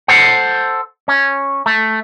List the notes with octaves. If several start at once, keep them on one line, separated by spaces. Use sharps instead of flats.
A4 C5 F#5
C#4
A3